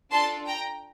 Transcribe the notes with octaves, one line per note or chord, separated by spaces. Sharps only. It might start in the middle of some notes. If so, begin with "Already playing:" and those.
D4 F4 A4 A5 C6
G5 A#5